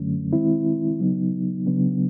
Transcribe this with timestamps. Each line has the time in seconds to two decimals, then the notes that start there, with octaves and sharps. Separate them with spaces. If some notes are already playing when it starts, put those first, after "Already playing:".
Already playing: F#2 D3 F#3 A3 C#4
0.33 D#3 G#3 C4 E4
0.99 C#3 F#3 B3 D#4
1.66 C#3 F#3 B3 D4